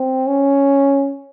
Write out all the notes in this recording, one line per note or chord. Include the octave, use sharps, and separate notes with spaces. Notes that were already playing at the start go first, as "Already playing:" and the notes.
Already playing: C4
C#4